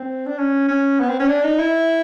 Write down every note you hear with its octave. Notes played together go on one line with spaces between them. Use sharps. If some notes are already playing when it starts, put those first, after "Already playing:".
Already playing: C4
D4
C#4
C#4
B3
C4
C#4
D4
D#4
E4